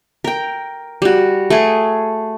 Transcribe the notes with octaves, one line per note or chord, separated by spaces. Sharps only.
A#4 G5
G3 F#4
A3 G#4